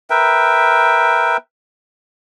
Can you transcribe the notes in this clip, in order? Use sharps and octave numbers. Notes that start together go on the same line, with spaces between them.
A#4 B4 E5 G5